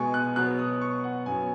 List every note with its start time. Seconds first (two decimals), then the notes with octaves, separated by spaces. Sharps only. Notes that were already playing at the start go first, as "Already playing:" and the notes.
Already playing: B2 G#3 B3 G#5 C#6
0.14 F#6
0.36 B2 F#3 B3 F#6
0.59 D#6
0.82 C#6
1.04 F#5
1.26 F#2 F#3 B3 G#5